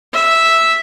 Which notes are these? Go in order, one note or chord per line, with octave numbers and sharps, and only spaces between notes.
E5